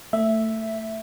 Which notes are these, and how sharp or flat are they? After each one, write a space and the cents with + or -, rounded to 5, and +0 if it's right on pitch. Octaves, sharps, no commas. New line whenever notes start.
A3 +20 E5 +0